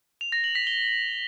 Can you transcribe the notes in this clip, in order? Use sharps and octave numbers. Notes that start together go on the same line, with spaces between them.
F7
A#6
F#7
B6
G7